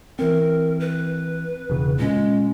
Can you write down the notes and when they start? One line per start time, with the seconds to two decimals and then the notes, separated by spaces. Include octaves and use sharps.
0.19 E3 C4 A#4
0.80 B4
1.70 E1 C#3
1.99 A#2 G#3 C#4